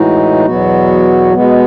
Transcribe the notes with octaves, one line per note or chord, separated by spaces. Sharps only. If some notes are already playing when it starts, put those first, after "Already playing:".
Already playing: A2 E3 G#3 D#4 F#4
E2 B2 F#3 B3 F#4
B2 G#3 B3